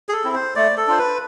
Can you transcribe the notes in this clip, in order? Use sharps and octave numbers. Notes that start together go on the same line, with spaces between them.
G#4
A4
C4 E4
C5
A3 D5
A4
D4 F4 C5
B4